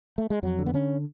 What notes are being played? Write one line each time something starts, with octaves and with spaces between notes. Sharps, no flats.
A3
G#3
F2 F#3
D3
B3
D3 C#4